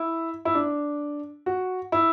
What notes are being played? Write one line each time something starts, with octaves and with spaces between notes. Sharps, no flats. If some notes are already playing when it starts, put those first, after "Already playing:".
Already playing: E4
E4
D4
F#4
E4